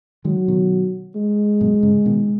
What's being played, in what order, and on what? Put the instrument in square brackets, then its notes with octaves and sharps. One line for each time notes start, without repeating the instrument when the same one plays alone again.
[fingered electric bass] D#3 G#3 [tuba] F#3
[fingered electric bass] B2 D#3
[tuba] G#3
[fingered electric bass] F#2 B2
G#2 C#3
B2 D#3